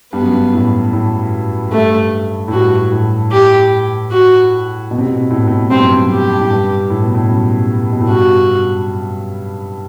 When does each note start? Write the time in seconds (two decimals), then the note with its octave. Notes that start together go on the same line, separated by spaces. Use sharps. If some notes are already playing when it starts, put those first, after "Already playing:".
0.13 G2 B3
0.22 F#2
0.32 G2
0.53 A2
0.93 A2
1.72 G2 A3
2.48 A2
2.52 G2 F#4
2.92 A2
3.32 G4
4.12 F#4
4.91 B2
4.98 C3
5.07 B2
5.31 A2
5.39 B2
5.47 A2
5.71 G2 C4
5.82 F#2
6.04 F#2
6.11 G4
6.40 A2
6.50 G2
6.90 A2
7.03 B2
7.15 A2
7.30 F#2
7.92 B2
8.01 A2
8.09 G2 F#4